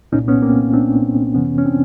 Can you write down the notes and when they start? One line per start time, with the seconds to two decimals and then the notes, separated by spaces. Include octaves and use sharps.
0.12 C2 A#2 C#4 D#4
0.28 B3 C#4
0.42 A#3 C4
0.74 C4 D4
1.34 F2 C3 E3 B3 C#4
1.58 C#4
1.65 C4 D4